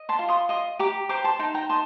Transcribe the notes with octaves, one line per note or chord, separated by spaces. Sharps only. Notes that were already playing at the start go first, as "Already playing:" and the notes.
Already playing: D#5
A5 C6
F4
C6 D#6
D#5 C6 D#6
G4 A#5 D6
C5 A#5 D6
A5 C6
D#4 A5 C6
G5 A#5
D#5 A5 C6